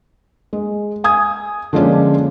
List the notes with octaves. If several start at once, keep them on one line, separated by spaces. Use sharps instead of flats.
G#3
G#5 D#6 G#6
D3 F3 G#3 A#3 C#4 D4